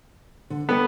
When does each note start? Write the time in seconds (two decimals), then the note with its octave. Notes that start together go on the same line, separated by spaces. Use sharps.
0.50 D3
0.69 B3 A4 D5 G5